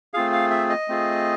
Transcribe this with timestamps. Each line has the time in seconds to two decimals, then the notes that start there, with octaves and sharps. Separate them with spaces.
0.14 A3 C4 F4 G#4 F5
0.33 F5
0.51 E5
0.69 D#5
0.88 A3 C4 F4 G#4